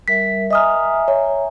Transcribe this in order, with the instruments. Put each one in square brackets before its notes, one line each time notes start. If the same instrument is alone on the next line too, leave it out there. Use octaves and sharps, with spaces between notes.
[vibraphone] G3 A#4 E5 [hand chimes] B6
[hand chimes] D#5 D#6 F6 [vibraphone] E5 G#5 A#5
[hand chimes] C#5